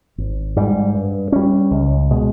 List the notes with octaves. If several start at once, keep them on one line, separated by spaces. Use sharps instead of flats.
G#1
G#2 G3
G2
G3 C#4
C#2
B2 G#3